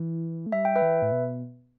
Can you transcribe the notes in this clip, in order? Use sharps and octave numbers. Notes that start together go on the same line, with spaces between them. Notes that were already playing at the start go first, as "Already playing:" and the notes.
Already playing: E3
A3
G3 E5
G5
B4 E5
E3
A2
B2